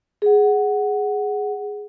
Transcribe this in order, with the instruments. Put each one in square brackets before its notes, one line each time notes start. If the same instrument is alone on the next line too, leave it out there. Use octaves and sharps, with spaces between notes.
[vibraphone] G#4 F#5